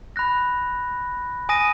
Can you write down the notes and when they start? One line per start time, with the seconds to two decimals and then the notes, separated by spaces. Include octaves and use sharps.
0.16 B5 F#6 A#6
1.49 G#5 D#6 A#6 D#7